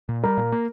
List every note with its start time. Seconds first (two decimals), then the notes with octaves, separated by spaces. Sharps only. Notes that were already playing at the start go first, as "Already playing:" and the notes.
0.09 A#2
0.24 G3 A#4
0.37 A#2
0.52 A#3